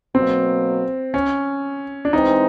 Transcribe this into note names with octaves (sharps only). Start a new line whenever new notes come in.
B2 F#3 A#3 C4
C#4
D4
E3 G#3 C4 D#4